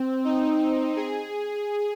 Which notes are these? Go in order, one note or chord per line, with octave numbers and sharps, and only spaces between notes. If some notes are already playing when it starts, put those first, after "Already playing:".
Already playing: C4
D#4
G#4